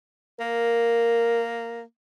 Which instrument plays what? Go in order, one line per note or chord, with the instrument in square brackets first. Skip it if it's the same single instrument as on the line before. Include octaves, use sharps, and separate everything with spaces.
[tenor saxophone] A#3 [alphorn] A#4